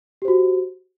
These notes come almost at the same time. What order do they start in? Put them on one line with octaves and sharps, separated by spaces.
G4 C5 F#4